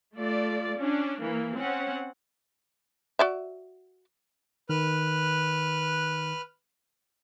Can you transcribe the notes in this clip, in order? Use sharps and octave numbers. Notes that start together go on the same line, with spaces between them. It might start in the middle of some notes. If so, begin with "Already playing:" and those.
A3 F4 D5
C#4 D4
E3 A#3
C4 C#4 F#5
F#4 D5 E5
D#3 B4 F6 F#6